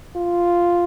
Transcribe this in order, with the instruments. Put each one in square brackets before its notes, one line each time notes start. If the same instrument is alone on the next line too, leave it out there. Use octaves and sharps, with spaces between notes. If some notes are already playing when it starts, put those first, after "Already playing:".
[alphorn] F4